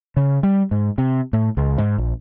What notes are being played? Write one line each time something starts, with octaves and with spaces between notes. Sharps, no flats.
C#3
G3
G#2
C3
A2
C#2
G#2
A#1